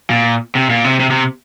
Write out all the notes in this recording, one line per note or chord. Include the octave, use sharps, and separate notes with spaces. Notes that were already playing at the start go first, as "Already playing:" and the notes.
A#2
C3
A#2
C3
C3
C3